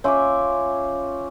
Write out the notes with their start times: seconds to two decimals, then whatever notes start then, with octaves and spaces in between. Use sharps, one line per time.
0.04 C#4 F4 C#5 E5 G#5 D6